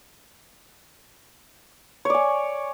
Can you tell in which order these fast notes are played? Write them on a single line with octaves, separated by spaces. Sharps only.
C#5 D5 G#5